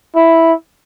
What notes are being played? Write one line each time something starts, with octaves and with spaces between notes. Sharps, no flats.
E4